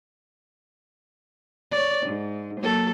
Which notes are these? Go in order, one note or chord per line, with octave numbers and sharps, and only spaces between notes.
C#5 D5
G#2
F#3 A#3 A4